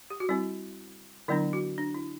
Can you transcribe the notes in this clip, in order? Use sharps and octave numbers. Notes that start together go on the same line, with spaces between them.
G4
F#4
G3 C4 E4
D3 F#3 B3 D4 E4
F#4
D4
E4